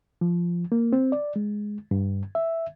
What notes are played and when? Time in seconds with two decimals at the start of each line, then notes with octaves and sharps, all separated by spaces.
0.21 F3
0.72 A#3
0.93 C4
1.12 D5
1.36 G#3
1.91 G2
2.35 E5